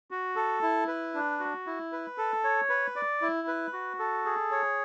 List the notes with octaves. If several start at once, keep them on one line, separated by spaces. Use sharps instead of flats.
F#4
A4
E4
B4
D4
F#4
E4
B4
A4
C#5
B4
D5
E4
B4
F#4
A4
G#4
C#5